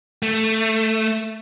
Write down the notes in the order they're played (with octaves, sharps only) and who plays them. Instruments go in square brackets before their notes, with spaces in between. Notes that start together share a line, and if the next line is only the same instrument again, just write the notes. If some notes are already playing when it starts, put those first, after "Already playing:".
[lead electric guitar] A3